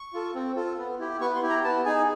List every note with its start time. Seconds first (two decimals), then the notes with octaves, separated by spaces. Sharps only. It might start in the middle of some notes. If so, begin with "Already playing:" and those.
Already playing: C#6
0.13 F4 A4
0.35 C4
0.56 F4 A4
0.78 B3
0.99 E4 G4
1.21 B3 C#6
1.35 C6
1.42 E4 G4
1.50 A#5
1.64 B3 A5
1.85 D#4 G#4 G#5